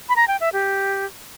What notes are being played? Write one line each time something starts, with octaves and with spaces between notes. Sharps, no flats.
B5
A#5
G5
E5
G4